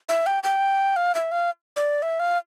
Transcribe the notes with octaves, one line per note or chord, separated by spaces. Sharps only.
E5
G5
G5
F5
E5
F5
D5
E5
F5